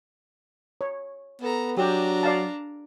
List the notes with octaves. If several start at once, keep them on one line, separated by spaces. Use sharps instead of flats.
C#5
B3 A4 A#5
F#3 D4 G4 A#5
D5 F5 A5